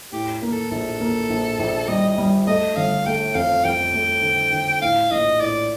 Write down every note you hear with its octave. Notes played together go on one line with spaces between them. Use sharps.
A2 G4
A#3
A4
A#1 A4
A#3
A#1
A#1
G3 D#5
G3
A3 D#5
G1 F5
A3 G5
F2 F5
F2 G5
A3
D3
D3
A2 F5
A#1 D#5
A2 D5